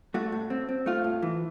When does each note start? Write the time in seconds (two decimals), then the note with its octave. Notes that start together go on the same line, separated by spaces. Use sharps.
0.14 A3 F#4
0.32 A2
0.50 C4
0.69 C4
0.86 A3 F4
1.04 A2
1.22 E3